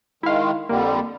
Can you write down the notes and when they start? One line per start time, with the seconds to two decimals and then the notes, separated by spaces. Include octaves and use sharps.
0.23 D#3 G#3 E4 F5
0.69 F2 D3 G3 A#3